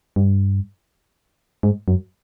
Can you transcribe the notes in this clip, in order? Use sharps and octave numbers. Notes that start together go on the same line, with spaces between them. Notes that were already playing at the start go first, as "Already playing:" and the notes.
G2
G#2
F#2